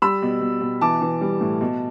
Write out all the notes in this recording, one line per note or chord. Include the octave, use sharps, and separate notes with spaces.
G3 B5 E6
B2
B2
B2
E3 A5 D6
E3
G3
A2
B2